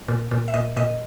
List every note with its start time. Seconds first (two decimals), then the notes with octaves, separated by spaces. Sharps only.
0.08 A#2
0.31 A#2
0.48 E5
0.54 A#2 D#5
0.76 A#2 D#5